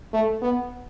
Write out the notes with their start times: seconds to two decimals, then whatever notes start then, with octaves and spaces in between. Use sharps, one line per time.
0.13 A3
0.42 B3